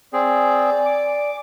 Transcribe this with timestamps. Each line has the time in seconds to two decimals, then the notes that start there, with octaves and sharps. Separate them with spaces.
0.13 C4 G#4 D5 G#5
0.85 D6